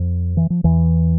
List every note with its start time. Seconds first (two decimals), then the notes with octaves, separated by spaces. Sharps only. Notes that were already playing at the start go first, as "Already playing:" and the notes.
Already playing: F2 F3
0.37 E3
0.50 F3
0.64 E2 E3